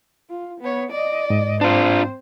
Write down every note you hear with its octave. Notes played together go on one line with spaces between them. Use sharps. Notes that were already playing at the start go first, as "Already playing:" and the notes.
F4
B3 C#5
D5 D#5
G#2
C4 D4 F4 C5